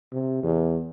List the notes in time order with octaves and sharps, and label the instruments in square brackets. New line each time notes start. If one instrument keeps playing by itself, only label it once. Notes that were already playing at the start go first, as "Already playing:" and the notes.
[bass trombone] C3
E2